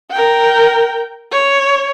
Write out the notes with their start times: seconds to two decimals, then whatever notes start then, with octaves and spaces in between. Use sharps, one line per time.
0.11 A#4 G5
1.32 C#5